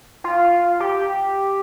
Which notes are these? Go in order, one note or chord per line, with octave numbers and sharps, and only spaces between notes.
F4
G4